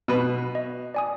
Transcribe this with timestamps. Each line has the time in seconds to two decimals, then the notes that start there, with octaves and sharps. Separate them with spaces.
0.08 B2 B3 B4
0.55 D#5
0.94 D5 G#5 D#6